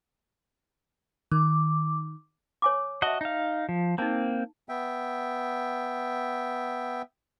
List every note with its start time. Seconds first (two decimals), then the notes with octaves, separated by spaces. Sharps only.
1.32 D#3 D6
2.62 C#5 G#5 D6
3.02 F#4 D#5 E5 A5
3.21 D#4 F5
3.69 F3
3.98 A#3 C4 D#4 A5
4.69 B3 E5 G5